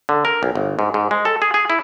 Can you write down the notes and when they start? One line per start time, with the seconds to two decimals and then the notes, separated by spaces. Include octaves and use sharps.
0.09 D3
0.25 A#4
0.43 B1
0.55 G1
0.79 G#2
0.94 G#2
1.11 G#3
1.25 A4
1.42 G#4
1.54 G#4
1.70 E4